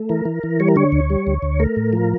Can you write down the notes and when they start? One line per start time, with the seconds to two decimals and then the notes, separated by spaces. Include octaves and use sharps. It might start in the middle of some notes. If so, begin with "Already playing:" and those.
Already playing: A3
0.09 E3 A#4
0.25 E3
0.43 E3
0.60 G3 C#5
0.68 A#4
0.76 D3 C#5
0.92 D2
1.10 G3
1.27 D2
1.42 D2
1.60 A3 A#4
1.76 A2
1.93 F3